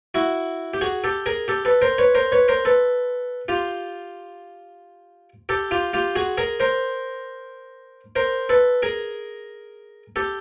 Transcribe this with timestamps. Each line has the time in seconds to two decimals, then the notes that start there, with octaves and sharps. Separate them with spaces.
0.14 E4 F#4
0.74 G4
0.81 F#4 G#4
1.04 G4 A4
1.26 G#4 A#4
1.48 G4 A4
1.65 A4 B4
1.82 A#4 C5
1.98 B4 C#5
2.15 A#4 C5
2.32 B4 C#5
2.48 A#4 C5
2.65 A4 B4
3.48 F4 G4
5.49 G4 A4
5.71 F4 G4
5.94 F4 G4
6.16 F#4 G#4
6.38 G#4 A#4
6.60 A#4 C5
8.16 A#4 C5
8.49 A4 B4
8.82 G#4 A#4
10.16 G4 A4